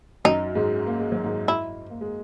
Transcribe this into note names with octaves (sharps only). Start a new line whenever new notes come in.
F#2 F#3 D#4
G#2 G#3
A#3
G#3
F#3
G#2 G#3
E4
A#3
G#3